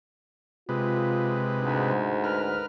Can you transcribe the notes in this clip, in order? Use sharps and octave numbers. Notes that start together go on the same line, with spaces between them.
C3 G#3 F4 B4
D2 G#2
A#4 B4 F6